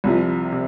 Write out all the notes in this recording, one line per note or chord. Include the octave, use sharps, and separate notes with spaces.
C2 C3 F3
C3